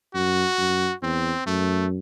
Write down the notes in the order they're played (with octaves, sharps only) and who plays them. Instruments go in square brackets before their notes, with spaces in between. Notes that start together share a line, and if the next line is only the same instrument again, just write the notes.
[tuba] F#2 [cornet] F#4
[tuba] F#2
[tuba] E2 [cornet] C4
[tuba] F#2 [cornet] A3